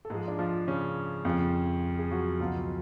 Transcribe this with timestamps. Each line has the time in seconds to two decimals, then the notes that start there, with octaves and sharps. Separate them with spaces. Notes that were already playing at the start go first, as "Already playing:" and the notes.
0.05 A4
0.10 G#2 F3 G#3 G#4
0.28 D4
0.38 F3 F4
0.67 C#3 C#4
1.25 F2 C#3 F3
1.99 G#4
2.11 F#3 F#4
2.39 C#2 B2 F3 F#3 F4